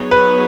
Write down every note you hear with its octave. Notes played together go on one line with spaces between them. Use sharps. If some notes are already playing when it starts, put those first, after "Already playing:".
Already playing: F#3 B3 D#4 G#4 C#5
B4